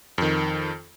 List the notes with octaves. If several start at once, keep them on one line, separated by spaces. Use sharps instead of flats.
F2 D#3